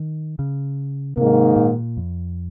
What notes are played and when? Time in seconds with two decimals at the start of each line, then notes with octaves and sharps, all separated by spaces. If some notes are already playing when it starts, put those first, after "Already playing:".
Already playing: D#3
0.39 C#3
1.17 G#2 C3 D#3 A#3
1.56 A#2
1.97 F2